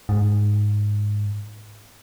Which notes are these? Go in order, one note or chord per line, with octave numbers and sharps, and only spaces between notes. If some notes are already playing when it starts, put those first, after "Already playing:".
G#2